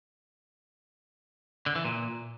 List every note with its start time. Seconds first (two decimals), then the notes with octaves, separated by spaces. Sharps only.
1.66 D3
1.75 E3
1.85 A#2